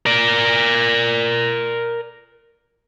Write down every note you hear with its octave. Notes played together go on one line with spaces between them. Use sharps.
A#4 D5